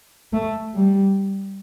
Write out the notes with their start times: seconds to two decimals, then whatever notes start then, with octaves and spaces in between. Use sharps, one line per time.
0.33 A3
0.74 G3